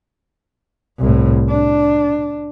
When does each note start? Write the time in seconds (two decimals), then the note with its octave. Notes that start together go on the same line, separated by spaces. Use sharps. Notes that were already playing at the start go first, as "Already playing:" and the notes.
0.99 C2 A2
1.49 D4